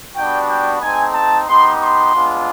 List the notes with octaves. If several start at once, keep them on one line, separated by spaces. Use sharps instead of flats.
G3 B3 D4 F#4 G5
G5
A3 C4 D#4 G#5
A5
B3 D#4 G4 C6
C6
G#3 B3 D4 F4